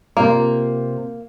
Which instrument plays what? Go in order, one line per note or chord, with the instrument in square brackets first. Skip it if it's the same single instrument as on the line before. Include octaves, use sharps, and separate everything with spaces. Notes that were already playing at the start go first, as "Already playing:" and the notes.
[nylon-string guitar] C3 F4 [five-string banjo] A#3